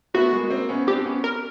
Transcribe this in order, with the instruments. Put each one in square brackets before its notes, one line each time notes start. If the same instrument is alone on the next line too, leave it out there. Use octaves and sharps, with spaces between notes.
[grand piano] A3 B3 [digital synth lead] F#4
[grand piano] G#3 A#3
A#3 C4
B3 C#4
[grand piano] C4 D4 [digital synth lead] G4
[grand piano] B3 C#4
[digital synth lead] A#4